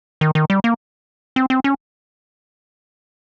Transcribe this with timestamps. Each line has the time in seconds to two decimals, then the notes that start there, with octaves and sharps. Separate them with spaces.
0.21 D#3
0.35 D#3
0.50 G3
0.64 A#3
1.36 C4
1.50 C4
1.64 C#4